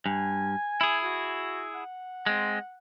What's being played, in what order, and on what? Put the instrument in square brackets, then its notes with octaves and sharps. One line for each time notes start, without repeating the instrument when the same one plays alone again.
[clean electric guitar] G2 [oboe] G#5
[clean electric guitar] E4 G#4
[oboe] F#4
F#5
[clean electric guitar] G#3 C4